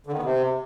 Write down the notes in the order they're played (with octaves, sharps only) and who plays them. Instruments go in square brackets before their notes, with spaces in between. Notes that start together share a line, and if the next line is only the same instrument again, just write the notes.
[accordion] D3
D#3
B3
C3